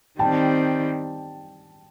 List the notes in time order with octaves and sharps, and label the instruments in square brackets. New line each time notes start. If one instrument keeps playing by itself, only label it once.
[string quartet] D#3 G3 C4 [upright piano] G5 A5